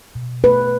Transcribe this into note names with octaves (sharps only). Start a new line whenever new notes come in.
B2
A3 B4